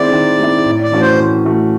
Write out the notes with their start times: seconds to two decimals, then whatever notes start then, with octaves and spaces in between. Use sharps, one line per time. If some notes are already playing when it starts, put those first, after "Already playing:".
Already playing: D#3 G#3 C4 E4 D5
0.12 D#3
0.39 G#3 C4 E4
0.65 A2
0.83 D5
0.92 E3 A3 C#4 F#4
1.01 C5
1.19 A2
1.45 E3 A3 C#4 F#4